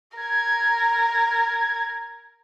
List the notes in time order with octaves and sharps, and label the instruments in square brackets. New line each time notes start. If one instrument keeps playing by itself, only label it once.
[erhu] A#4 [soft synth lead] G#6